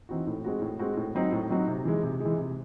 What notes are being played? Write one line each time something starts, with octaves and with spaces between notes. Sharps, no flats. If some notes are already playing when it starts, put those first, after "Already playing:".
E3 C4 D#4 F#4
A2
G#3 C4 F#4
A2
G#3 C4 F#4
A2
F#3 C4 D#4 F#4
A2
F#3 C4 D#4 F#4
C3
E3 G#3
C3
E3 G#3
C3